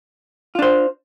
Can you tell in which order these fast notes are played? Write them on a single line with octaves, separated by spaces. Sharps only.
F4 D4 C5